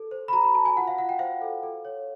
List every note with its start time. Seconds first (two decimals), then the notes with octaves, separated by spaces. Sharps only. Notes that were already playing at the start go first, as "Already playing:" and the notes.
Already playing: A4
0.11 C5
0.28 B5
0.33 F#4 A#5
0.44 B5
0.54 F#4 A5
0.65 G#5
0.76 F4 F#5
0.87 F5
0.98 F4 F#5
1.09 G5
1.19 C5 F5
1.41 A4
1.63 A4
1.85 C#5